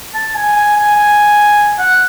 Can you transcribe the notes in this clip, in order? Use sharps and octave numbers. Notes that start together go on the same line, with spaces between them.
A5
G#5
G#5
G#5
G#5
F#5